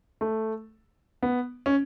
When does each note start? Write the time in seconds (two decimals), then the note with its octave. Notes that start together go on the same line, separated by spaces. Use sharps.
0.21 A3
1.23 B3
1.66 C#4